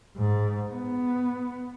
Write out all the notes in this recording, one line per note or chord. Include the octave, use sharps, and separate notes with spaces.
G#2
B3